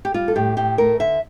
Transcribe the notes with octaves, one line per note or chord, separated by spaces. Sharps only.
G4
G3 F4
A4
A2 G4
A2 G4
A3 A#4
D3 E5